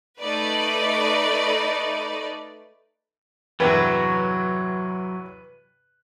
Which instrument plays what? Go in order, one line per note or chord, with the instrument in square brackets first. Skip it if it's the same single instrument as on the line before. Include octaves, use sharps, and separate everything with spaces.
[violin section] A3 D#4 B4 D5
[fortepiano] E2 G2 C3 [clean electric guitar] F#3 [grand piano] B4